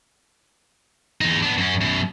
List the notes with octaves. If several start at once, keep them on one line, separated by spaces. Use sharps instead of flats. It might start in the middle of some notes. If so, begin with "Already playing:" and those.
E2 D#4
B3 D4
F#2 C#4
F#2 B2